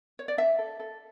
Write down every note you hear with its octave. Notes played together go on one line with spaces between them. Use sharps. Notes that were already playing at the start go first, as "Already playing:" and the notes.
C#5
D5
D4 E5
A4
A4